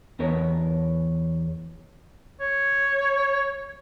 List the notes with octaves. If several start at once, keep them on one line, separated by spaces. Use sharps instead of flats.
E2 B3 A#4 C#5
C#5